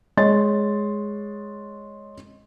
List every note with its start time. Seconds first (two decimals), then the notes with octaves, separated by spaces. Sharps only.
0.17 G#3 C#5 D#5 C6 A6